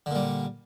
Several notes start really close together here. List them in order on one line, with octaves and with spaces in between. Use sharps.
D3 A#2 G3